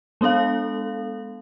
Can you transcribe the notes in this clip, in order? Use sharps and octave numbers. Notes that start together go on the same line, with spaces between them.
G#3 B3 D4 A4 F5